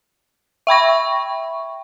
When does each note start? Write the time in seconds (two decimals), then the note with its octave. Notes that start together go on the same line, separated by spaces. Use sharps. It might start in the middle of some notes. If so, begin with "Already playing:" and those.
0.67 E5 G5 B5 C#6